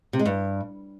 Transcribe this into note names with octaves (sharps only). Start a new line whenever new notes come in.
C3
G#3
G2